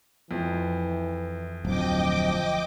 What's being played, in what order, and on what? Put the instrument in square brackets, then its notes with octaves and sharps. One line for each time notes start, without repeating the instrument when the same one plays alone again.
[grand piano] F2 [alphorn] E3
[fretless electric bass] D1 [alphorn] F3 [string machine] D#5 G5 D6